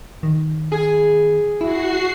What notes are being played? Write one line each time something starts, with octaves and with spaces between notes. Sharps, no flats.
D#3
G#4
E4 F#4 C7